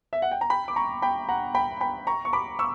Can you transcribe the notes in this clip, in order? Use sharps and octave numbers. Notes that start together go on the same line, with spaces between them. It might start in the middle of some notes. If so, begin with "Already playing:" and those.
E5
F#5
G5
A#5
G5 B5
D6
A#5 C#6
G5 B5
F#5 A#5
G5 B5
G5 B5
A#5 C#6
C#6
B5 D6
C#6 E6